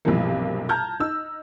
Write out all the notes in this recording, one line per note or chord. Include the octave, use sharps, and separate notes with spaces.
B1 G2 C3 E3 F3 A#3
A5 A#5 F6 G6 G#6
D#4 E6